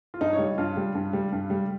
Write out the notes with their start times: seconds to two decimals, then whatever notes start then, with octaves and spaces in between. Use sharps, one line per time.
0.14 F4
0.21 G2 D#4
0.33 C#5
0.39 G3
0.58 G2 F4
0.77 G3
0.95 G2
1.13 G3
1.32 G2
1.50 G3